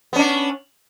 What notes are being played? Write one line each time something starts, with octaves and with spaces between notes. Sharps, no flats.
B3 C#4 D4